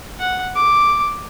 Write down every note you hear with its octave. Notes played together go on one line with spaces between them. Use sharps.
F#5
D6